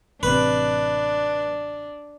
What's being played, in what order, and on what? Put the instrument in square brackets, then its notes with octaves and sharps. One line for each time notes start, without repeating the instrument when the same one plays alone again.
[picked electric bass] A1 C3 [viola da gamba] D4 [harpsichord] B4